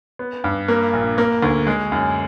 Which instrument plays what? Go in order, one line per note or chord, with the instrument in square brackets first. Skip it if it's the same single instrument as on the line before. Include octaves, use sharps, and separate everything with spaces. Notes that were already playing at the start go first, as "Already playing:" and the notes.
[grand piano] B3
G2
A#3
A#1
A#3
D2
G#3
F#2